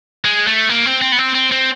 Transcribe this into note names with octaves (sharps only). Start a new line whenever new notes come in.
G#3
A3
A#3
C4
C4
B3
C4
C4
C4